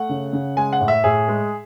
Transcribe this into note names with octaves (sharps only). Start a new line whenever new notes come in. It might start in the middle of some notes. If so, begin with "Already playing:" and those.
Already playing: A3 F#5
C#3
C#3
G#3 G#5
F#5
A2
E5
A2 G#4
G#3